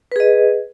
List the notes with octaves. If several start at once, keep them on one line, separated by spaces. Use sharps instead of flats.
G#4 B4 D#5